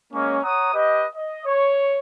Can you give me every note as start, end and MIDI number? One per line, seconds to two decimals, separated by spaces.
0.13 0.38 56
0.13 0.38 58
0.13 0.38 61
0.44 0.71 73
0.44 0.71 78
0.44 0.71 82
0.44 0.71 87
0.74 1.06 67
0.74 1.06 71
0.74 1.06 75
1.15 1.45 75
1.46 1.99 73